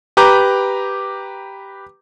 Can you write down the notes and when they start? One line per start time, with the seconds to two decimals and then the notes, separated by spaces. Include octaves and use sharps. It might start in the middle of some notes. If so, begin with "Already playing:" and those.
0.17 G4 B4 A#5 D6 G6